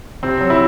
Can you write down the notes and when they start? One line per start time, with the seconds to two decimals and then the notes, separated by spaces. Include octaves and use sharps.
0.23 C3 C4
0.41 F#3
0.50 E4